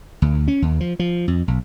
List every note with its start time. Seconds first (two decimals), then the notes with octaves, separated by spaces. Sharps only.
0.22 D2
0.48 C#4
0.62 D#2
0.80 F3
0.99 F3
1.28 F2
1.48 B1